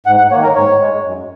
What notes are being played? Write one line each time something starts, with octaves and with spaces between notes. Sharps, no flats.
G#2 F#5
F#5
D#3 A#3 C#5
A#4
G#2 C#5
G#3
F#2